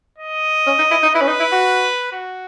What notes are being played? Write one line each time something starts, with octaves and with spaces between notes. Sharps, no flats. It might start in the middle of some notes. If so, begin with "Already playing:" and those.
D#5
C#4
D#4
E4
D#4
E4 B4
C#4
D#4
E4
F#4
F#4